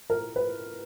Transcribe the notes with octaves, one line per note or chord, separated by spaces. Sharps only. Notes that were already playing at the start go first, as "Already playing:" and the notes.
A#4
B4